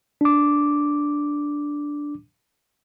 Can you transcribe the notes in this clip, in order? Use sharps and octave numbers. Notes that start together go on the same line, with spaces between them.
D4 D6